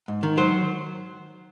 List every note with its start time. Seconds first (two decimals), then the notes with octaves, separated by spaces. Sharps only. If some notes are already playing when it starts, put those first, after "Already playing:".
0.08 G#2
0.23 D#3
0.38 F#3 C5